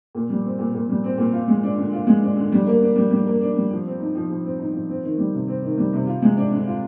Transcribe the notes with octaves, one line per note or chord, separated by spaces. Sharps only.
A#2
G3
C4
A#2
A#2
G3
C4
A#2
F4
G#3
D4
D3
F4
G#3
D4
D3
G3
A#3
D4
G3
G3
A#3
D4
G3
F3
C4
D#4
F3
F3
C4
D#4
F3
C4
D#3
G3
C3
C4
D#3
G3
C3
F4
G#3
D4
D3
F4